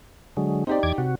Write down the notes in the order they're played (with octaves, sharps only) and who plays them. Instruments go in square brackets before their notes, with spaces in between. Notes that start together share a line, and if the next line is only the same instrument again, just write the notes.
[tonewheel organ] D3 F#3 G#3
[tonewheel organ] C4 [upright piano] D#4 G4 D5
[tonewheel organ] E2 D6 G#6
C3 F#4